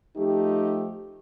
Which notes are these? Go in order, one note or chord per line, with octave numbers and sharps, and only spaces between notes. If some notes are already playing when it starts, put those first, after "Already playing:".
F3 A3 D#4 G4